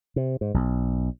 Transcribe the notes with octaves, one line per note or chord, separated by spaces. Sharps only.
C3
G#2
B1